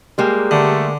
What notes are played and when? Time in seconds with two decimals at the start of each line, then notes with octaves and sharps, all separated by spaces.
0.18 G3 G#3 A#3 G4 G#4 G5
0.51 D3 A3